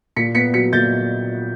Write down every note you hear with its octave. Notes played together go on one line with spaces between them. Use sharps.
A#2 B6 C#7
B3 B6 C#7
F#3 B6 C#7
A#2 G6 A6